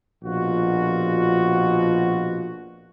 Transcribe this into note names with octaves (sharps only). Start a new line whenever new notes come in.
A#1 B2 F4 F#4